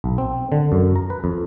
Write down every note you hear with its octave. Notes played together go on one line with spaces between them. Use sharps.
B1
C4
D3
F#2
A#5
B4
F2